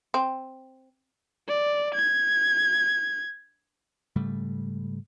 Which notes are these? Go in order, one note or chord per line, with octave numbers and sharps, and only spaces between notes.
C4
D5
G#6
G#2 C#3 G3 A3